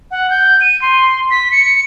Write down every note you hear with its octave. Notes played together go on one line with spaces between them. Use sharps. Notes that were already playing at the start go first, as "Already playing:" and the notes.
F#5
G6
D#7
C6
B6
C#7